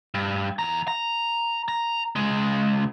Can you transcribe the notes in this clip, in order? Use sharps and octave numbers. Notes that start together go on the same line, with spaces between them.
G2
E2 A#5
A#5
A#5
C#2 G#3